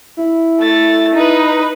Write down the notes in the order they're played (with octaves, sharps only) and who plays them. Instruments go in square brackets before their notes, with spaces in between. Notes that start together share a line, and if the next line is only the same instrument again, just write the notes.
[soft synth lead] E4
[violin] A3 A6
D#4 B4